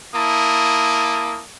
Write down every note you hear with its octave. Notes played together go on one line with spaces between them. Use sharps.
A#3 E4 A5 D#6